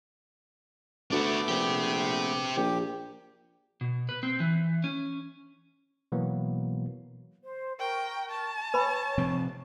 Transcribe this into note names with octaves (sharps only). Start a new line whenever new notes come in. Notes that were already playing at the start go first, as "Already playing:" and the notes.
D2 A3 B3 D4 F#4 D6
A#1 C4 G4
A#1 G4
B2
B4
C4
E3
C#4
B2 E3 F#3 A#3 B3
C5
A#4 G5 C#6
A5
B4 C#5 G#5 B5 C#6
C3 F3 C4